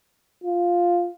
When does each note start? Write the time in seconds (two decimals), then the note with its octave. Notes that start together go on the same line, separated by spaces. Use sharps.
0.44 F4